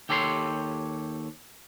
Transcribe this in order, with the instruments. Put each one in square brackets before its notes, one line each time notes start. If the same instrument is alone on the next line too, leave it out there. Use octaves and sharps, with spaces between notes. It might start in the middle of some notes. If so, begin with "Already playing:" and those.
[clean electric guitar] D#2 G4 A4 C#5 A#5 C6